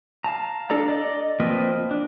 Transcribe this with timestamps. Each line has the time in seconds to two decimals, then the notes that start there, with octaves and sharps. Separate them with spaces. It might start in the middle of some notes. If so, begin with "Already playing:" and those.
0.24 F5 A5 A#5
0.70 D4 A4 D5 A#5
0.88 D5 D#5 D6
1.40 F3 A#3 C4 B4 D#5
1.91 D4